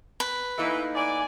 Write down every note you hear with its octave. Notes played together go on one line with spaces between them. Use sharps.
B4
E3 A3 A#3 D#4
D5 G#5